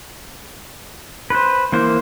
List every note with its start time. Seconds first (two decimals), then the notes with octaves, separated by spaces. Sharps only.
1.30 B4 C5
1.72 E3 A#3 C5